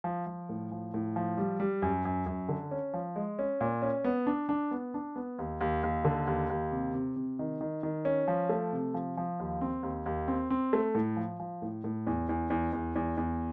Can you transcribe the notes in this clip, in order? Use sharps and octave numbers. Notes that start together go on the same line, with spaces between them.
F3
F3
A2
F3
A2
F3
G3
G3
F#2
F#2
F#2
D3
C#4
F3
G#3
C#4
A#2
C#4
B3
D4
D4
B3
D4
B3
D#2
D#2
D#2
D3
D#2
D#2
C3
C3
C3
D#3
D#3
D#3
C#4
F3
A3
C3
F3
F3
D#2
C4
D#2
D#2
C4
C4
A3
A2
F3
F3
A2
A2
E2
E2
E2
E2
E2
E2